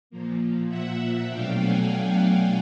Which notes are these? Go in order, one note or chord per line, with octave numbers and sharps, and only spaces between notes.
A#2 F3 A#3
E5 F#5
B2 F#3 A3 D4 F5 G5
F#5 G#5
F5 G5